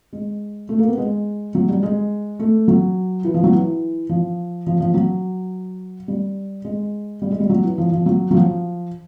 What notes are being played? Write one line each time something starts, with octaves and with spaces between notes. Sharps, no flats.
G#3
A3
A#3
B3
G#3
F#3
G3
G#3
A3
F#3
E3
F3
F#3
E3
F3
F3
F3
F#3
G3
G#3
G3
G#3
G3
F#3
E3
F3
F3
F#3
F#3
F3